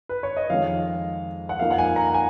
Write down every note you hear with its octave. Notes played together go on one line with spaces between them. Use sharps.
B4
C#5
D#5
F2 D#3 G#3 F5
F#5
F2 F3 A#3 D#4 F5
F#5
G#5
A#5
G#5